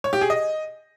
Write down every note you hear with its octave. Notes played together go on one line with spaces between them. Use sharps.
C#5
G4
G#4
D#5